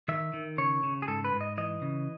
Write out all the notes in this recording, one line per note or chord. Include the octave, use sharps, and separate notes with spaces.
D#3 E5
D#3
C#3 C#5
C#3
G#4
G#2 A4
B4
G#2
D#5
E3 D#5
C#3